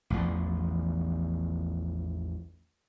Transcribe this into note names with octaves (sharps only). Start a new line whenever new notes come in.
A1 E2 F3